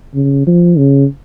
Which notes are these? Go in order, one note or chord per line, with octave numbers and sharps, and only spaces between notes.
C#3
F3
C#3